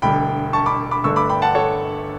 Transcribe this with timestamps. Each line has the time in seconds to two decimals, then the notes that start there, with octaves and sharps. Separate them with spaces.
0.02 E1 D2 D3 G3 G5 B5
0.53 A5 C#6
0.66 B5 D6
0.91 B5 D6
1.04 G1 G2 D3 A3 C#6 E6
1.16 B5 D6
1.29 G5 B5
1.42 F#5 A5
1.55 A4 C#5